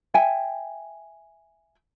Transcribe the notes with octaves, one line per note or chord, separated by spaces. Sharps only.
E5 G5 G#5